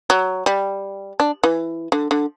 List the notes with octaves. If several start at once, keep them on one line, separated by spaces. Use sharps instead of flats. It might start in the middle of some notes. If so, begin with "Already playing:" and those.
F#3
G3
D4
E3
D3
D3